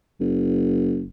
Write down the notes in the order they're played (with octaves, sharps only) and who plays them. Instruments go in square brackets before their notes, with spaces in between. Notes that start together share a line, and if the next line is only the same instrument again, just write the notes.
[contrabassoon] F#1